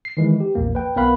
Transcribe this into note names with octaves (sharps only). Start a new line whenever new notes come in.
C7
D#3 E3 G#3
G4
A#1 E2 A#3
B4 G5
B1 B3 A#4 B4 F5 B5